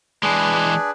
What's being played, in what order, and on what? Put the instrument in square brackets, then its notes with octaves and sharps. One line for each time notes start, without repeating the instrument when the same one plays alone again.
[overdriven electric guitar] E3 G#3 [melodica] D4 G#4 B4